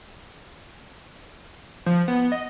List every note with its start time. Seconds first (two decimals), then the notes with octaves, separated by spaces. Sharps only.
1.86 F3
2.08 B3
2.32 D#5